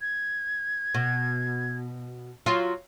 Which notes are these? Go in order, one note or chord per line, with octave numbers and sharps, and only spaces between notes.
G#6
B2
F#3 F4